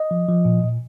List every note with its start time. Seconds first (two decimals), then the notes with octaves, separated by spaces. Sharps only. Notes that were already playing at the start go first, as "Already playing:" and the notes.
Already playing: D#5
0.11 F3
0.28 F3
0.45 A#2
0.64 A#2